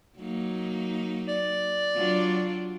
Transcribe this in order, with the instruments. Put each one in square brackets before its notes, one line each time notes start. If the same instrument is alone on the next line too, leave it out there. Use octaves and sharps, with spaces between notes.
[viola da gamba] F#3 A#3 D#4
[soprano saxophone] D5
[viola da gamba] F#3 D4 F4